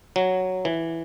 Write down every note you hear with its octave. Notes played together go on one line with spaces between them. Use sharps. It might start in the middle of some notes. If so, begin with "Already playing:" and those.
F#3
E3